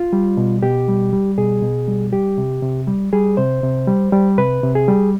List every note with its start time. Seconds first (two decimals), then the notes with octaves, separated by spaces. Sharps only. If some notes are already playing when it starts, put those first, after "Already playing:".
Already playing: F4
0.13 G3
0.37 B2
0.62 B2 G4
0.88 G3
1.13 G3
1.38 B2 G#4
1.63 B2
1.88 G3
2.13 G3 G4
2.38 C3
2.63 C3
2.87 G3
3.13 G3 G#4
3.37 C3 C5
3.63 C3
3.87 G3
4.12 G3
4.38 C3 B4
4.63 C3
4.75 G#4
4.88 G3